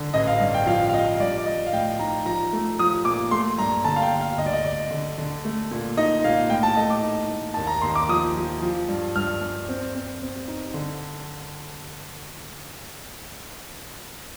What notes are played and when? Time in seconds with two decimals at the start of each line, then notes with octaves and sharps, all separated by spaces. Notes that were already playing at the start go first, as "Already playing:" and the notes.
Already playing: D3
0.13 A1 D#5
0.27 F5
0.40 G2
0.54 G5
0.66 F3 F5
0.89 F5
0.94 F3 D#5
1.20 G3 D5
1.38 D5
1.46 G3 D#5
1.66 F5
1.73 A2 G5
1.99 D#4 A#5
2.25 F3 A#5
2.53 A3
2.79 F3 D#6
3.05 A#2 D6
3.31 A3 C6
3.58 G2 A#5
3.84 D3 A5
3.96 F5
4.02 G5
4.12 D3
4.21 F5
4.37 D2 D#5
4.46 D5
4.53 D#5
4.64 D2 D5
4.91 D3
5.18 D3
5.45 A3
5.71 A#2
5.97 D#4 D#5
6.24 A#2 F5
6.50 A2 G5
6.63 A5
6.76 A3 D#5
6.90 D6
7.03 D#4
7.30 A3
7.54 D#2 A5
7.67 A#5
7.82 D#2 C6
7.95 D6
8.09 F3 D#6
8.36 F3
8.62 F3
8.88 G2
9.16 G2 F6
9.41 G2
9.69 C4
9.95 C4
10.22 C4
10.48 D#4
10.74 D3